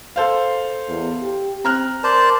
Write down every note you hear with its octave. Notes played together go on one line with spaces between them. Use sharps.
A4 C5 F5
E2
G4
C4 A#5 F6 F#6
A#4 C5 D5 A5